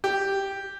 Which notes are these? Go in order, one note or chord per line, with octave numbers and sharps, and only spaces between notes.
G4